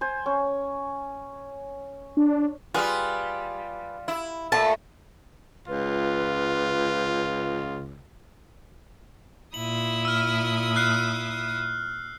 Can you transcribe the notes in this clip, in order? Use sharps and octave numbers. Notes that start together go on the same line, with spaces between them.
C5 G#5
C#4
D4
G3 F4 G#4 B4
E4
A#2 A3 A5
C#2 F4 B4
A#2 E4 D#6 F#7
E6 F6
F6 F#6 C7